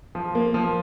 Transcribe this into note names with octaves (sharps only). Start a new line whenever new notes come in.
F3
A#3
F3